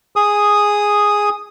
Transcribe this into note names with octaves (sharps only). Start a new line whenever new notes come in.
G#4 D#6